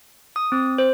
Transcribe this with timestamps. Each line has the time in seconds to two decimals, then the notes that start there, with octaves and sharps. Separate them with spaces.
0.36 D#6
0.52 C4
0.78 C5